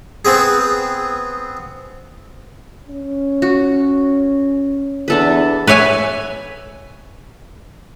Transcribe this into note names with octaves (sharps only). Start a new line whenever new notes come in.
B3 C4 G#4
C#4
F#4
E2 D4 A4 B4
B4 C#5 E5 G#5